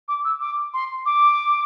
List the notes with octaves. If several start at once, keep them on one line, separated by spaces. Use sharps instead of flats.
D6
E6
D6
C6
D6